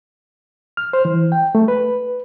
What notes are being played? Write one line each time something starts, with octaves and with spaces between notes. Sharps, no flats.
F6
C5
E3
G5
A3
B4